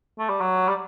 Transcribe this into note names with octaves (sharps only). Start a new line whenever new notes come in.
A3
G3
F#3
G3